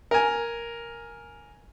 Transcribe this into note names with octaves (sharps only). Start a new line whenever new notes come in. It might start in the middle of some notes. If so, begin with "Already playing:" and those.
A#4 G#5